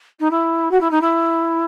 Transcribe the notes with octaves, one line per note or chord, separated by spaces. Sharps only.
D#4
E4
F#4
E4
D#4
E4